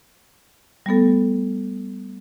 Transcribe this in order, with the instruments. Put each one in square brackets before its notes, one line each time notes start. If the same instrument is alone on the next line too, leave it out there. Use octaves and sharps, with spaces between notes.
[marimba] G3 A3 B3 A4